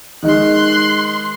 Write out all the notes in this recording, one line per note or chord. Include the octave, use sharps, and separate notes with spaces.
D#3 G#3 D#4 C6 F#6